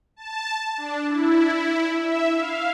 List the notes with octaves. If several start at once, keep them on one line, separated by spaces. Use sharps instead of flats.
A5
D4
E4
E5
F5